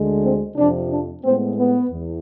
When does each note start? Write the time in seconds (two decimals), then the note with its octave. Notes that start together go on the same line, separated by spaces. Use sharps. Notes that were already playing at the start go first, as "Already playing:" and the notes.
Already playing: D2 D3 G#3
0.23 C4
0.56 F2 C3 F3 D4
0.90 D4
1.23 A2 G#3 B3 C4
1.58 B3
1.91 E2